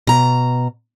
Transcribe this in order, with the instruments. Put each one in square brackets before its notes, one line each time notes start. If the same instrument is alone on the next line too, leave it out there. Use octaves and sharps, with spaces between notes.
[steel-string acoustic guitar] B2 A#5